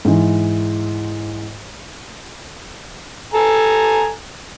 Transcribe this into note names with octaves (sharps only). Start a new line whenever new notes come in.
G#2 E3
A4 G#5 A#5